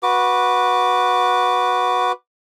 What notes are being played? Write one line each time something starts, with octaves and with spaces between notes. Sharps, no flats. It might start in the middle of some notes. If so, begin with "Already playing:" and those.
F#4 B4 D6